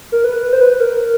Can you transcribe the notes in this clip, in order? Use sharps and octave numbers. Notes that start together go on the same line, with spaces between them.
A#4
B4
B4
C5
B4
A#4